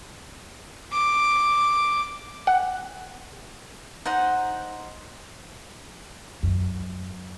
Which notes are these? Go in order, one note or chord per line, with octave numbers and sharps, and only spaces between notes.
D6
F#5
D#4 C5 F#5
F#2